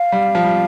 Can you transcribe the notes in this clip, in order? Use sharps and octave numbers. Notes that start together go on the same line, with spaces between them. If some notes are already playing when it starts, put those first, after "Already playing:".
Already playing: F5
G3
F3
G3